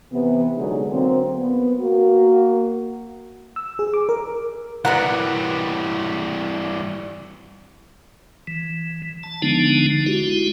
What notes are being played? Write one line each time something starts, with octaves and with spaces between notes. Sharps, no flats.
C3 E3 B3
B2 D3 E3 F#3 G#3 D#4
D3 F#3 A#3 C4
B3
A#3 F#4
E6
G#4
D6
A#4
E3 G3 B3 A#4 F#5
E3
A5
D3 F3 G#3 B3 D4 D#4
G#3 E4 F#4 G4